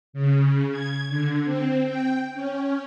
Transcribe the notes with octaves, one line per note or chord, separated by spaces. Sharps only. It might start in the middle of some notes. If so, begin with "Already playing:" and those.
C#3
G#6
D3
C4
G5
C#4